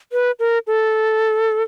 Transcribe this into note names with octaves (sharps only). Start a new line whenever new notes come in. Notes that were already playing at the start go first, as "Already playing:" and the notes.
B4
A#4
A4